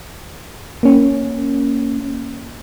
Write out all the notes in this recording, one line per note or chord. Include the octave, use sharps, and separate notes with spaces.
A#3 C#4